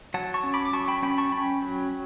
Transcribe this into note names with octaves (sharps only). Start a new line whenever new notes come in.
F#3 F#5 A5
A5 C#6
C#4
B5 D6
D6
F#3 A5 C#6
G5 B5
C#4 G5 B5
A5 C#6
C#4 G5 B5
F#3